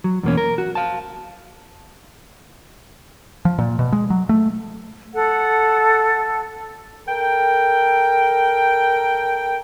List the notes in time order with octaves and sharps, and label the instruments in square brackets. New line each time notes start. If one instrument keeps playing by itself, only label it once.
[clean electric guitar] F#3
E2 B2 A#3 C#4
A#4
F#4
F5 A5
[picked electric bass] F3
A#2
B2
G#3
F#3
A3
[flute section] A4 F#5
[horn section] A4 A#4 G5